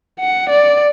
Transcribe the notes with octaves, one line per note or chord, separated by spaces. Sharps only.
F#5
D5